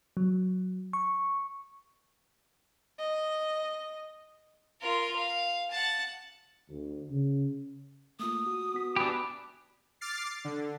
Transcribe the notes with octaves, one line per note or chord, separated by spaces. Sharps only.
F#3
C#6
D#5
F4 A#4
F5
F#5 A5
D2
C#3
A3 A#3 F4 D#6
F#4
B3 F#4 B6
D4 E4 G4 B4 G#5
D6 F6 A6 C7
D3